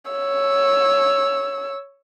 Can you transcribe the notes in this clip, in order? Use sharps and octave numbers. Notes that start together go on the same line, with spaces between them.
C#5 E6